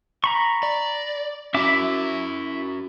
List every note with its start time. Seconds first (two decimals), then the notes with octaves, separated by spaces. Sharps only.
0.24 A#5 B5 C#6
0.63 D5
1.54 C#4 E4 F#4 E5 D6